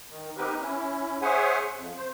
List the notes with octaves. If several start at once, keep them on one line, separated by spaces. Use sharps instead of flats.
D#3
B3 C4 D#4 G4 A#4 B4
C#4 E4
G#4 C5 C#5 E5 F#5 G#5
F2
C5